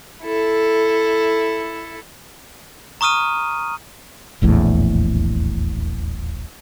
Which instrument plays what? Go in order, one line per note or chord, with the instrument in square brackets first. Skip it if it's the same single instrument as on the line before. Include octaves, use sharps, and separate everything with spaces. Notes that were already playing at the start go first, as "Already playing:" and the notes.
[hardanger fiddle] E4 A4
[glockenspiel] A#5 C#6 D#6 F6 D#7
[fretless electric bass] D#1 A#1 E2 A2